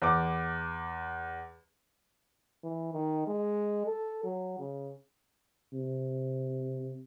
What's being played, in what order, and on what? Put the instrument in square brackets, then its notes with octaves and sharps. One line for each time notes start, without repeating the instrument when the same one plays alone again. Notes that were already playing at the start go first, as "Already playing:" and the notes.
[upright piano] E2 D6
[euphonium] E3
D#3
G#3
A4
F#3
C#3
[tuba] C3